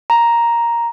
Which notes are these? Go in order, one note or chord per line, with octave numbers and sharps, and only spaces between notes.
A#5